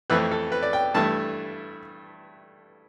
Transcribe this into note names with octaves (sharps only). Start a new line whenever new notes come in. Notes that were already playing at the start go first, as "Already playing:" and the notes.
F2 E3 A3 C4 B4
A4
B4
D5
G5
G2 E3 A3 A5